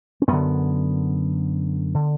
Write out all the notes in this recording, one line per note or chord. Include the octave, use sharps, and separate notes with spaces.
C#4
F#2 D3 B3
D3